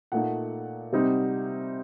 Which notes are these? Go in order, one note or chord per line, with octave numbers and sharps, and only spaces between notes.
A#2 A3 D#4 F#5
C3 G3 C4 D#4